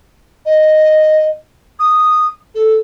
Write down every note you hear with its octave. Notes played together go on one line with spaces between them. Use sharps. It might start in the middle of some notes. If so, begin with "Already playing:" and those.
D#5
D#6
A4